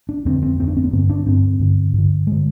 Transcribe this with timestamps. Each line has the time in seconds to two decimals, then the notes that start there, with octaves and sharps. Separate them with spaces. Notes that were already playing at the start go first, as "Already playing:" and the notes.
0.09 D4
0.25 F2 D3 C4
0.43 C4
0.59 F2 D3 C4
0.68 D4
0.77 C4
0.84 B3
0.93 G2 D3 C4
1.10 D4
1.26 G2 D3 C4
1.59 G2 D3
1.93 G2
1.98 D3
2.27 D3 G#3